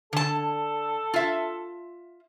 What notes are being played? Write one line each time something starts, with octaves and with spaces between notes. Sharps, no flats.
D3 A4 A5
F4 E5